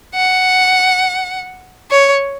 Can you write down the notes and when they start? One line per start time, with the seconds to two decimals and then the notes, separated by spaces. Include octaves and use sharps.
0.15 F#5
1.91 C#5